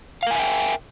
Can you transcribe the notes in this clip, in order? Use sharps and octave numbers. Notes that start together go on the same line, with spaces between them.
A#4 E5 F5 G5 G#5